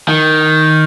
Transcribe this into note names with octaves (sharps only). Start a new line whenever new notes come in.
D#3